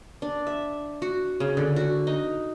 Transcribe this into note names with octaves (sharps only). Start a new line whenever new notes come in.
D4
E5
F#4
C#3
D3
F#4
D#4